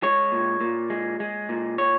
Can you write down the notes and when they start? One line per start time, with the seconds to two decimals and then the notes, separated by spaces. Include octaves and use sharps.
0.03 G#3 C#5
0.32 A#2
0.61 A#2
0.90 G#3
1.20 G#3
1.49 A#2
1.78 C#5